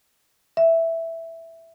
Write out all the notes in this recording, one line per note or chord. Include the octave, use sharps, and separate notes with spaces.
E5